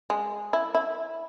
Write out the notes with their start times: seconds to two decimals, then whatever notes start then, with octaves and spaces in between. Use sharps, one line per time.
0.10 G#3
0.53 E4
0.75 E4